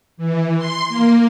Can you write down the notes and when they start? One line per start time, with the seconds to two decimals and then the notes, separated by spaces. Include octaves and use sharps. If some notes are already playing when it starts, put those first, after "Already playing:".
0.17 E3
0.57 C6
0.88 A#3